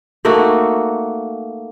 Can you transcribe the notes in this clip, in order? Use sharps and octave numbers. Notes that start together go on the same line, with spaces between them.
A3 A#3 D#4 F#4